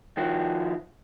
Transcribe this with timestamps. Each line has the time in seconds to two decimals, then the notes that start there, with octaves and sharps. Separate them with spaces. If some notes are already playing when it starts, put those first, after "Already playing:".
0.17 D#3 F3 F#4